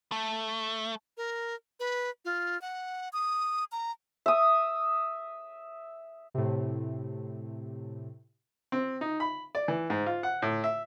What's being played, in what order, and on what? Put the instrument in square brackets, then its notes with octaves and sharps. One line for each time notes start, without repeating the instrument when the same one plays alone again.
[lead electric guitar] A3
[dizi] A#4
B4
F4
F#5
D#6
A#5
[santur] E5 D#6
[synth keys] A2 C3
[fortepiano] C4
D#4
B5
D5
E3
G#2
F4
F#5
A2
E5